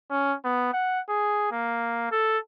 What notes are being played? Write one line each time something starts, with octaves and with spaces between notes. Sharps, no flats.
C#4
B3
F#5
G#4
A#3
A4